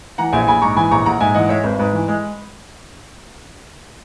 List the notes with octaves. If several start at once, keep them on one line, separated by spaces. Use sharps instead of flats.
E3 F#5 A#5
A#1 E5 G#5
A#1 G#5 B5
G#2 A#5 C#6
E3 G#5 B5
A#1 A#5 C#6
A#1 F#5 A#5
G#2 E5 G#5
E3 D#5 F#5
G#3 C#5 E5
G#1 B4
G#2 B4
E3
G#3